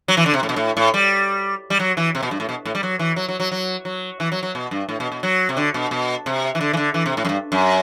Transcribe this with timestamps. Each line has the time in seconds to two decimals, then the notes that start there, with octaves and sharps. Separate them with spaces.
0.08 F#3
0.17 E3
0.26 D3
0.33 C3
0.43 A2
0.49 B2
0.56 A2
0.77 A2
0.94 G3
1.70 G3
1.79 F#3
1.97 E3
2.15 C3
2.23 B2
2.31 G2
2.40 A2
2.49 B2
2.65 A2
2.75 G3
2.83 F#3
2.99 E3
3.16 F#3
3.29 F#3
3.40 F#3
3.52 F#3
3.85 F#3
4.20 E3
4.32 F#3
4.43 F#3
4.55 B2
4.71 G2
4.89 A2
5.00 B2
5.12 B2
5.23 F#3
5.49 C3
5.57 D3
5.74 B2
5.91 B2
6.26 C3
6.55 E3
6.61 D3
6.73 E3
6.77 D3
6.94 E3
7.06 C3
7.17 A2
7.25 F#2
7.29 G2
7.52 F#2